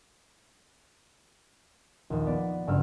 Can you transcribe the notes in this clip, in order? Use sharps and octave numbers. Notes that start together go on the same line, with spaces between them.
A#1 D#2
B3 D5
F#1 G2 E6 F6